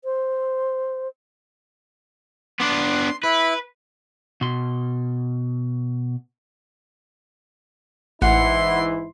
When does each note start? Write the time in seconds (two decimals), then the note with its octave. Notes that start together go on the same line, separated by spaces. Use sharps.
0.04 C5
2.60 B3 D4 C6
3.24 E4 B4 B5
4.41 B2 C6
8.22 A1 G#2 E3 E4 F#5 C6